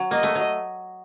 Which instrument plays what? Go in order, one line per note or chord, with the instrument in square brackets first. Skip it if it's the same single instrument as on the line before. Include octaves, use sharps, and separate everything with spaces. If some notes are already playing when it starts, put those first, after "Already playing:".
Already playing: [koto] F#3
[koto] A#3 [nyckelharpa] D#5
[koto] A3
F#3